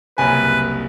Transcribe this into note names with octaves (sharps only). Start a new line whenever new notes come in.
F#1 C2 B4 G#5